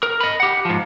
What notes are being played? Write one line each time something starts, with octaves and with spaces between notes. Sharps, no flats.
A#4
D#5 B5
G4 F#5
G#2 F3